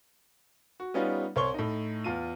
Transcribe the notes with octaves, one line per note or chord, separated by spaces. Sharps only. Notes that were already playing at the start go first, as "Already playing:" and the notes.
F#4
G3 B3 C#4 D#4 F4
C2 C5 C#5 C6 C#6 G7
A2 D#4
E2 F4 D#7